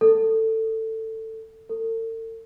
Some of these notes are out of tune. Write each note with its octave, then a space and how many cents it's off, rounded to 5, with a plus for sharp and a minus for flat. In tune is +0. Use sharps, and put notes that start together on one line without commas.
A4 +15
A4 +45